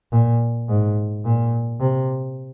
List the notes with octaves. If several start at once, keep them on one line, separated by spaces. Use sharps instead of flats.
A#2
G#2
A#2
C3